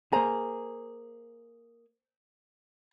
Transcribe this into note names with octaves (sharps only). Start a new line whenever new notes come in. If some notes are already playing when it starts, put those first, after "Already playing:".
A#3 G#4 C5 A#5